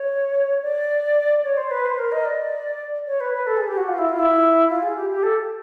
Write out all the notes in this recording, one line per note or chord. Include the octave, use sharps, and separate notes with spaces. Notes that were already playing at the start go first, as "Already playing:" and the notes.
Already playing: C#5
D5
C#5
C5
B4
C5
A#4
D#5
D5
C#5
B4
B4
A4
G#4
G4
F#4
F4
E4
F4
E4
F4
G#4
G4
G4
A4